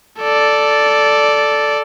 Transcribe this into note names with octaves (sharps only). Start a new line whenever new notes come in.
A4 D5